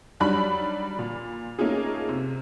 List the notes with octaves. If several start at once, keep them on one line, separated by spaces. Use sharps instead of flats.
D#3 F#3 G3 D4 B5 F#6
A#2
A3 A#3 C#4 D#4 F4 G#4
C3